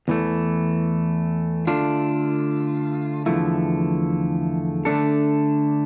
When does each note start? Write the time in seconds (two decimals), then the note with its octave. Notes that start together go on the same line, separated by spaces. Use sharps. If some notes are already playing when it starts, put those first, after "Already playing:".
0.08 E2 E3 A3
1.67 D3 A3 D4 F4
3.26 E2 D3 F3 A3 E4
4.85 D3 A3 D4 A4